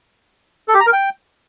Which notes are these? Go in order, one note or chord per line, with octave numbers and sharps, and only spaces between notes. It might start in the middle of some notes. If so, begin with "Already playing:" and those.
A4
G4
A#5
A#4
G5